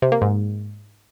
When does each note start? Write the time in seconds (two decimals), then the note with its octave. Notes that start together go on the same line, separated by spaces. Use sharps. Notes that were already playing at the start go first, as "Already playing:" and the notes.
0.02 C3
0.12 A#3
0.22 G#2